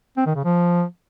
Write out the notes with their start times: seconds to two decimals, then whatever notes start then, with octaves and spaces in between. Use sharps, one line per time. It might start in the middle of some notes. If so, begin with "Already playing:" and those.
0.17 C4
0.26 D#3
0.35 C#3
0.44 F3